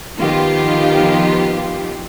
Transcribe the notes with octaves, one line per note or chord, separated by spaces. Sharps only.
D#3 F3 B3 F4 G4